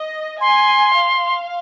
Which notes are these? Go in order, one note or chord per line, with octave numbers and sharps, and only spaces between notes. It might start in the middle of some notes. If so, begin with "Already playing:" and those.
Already playing: D#5
G#5 C6
F5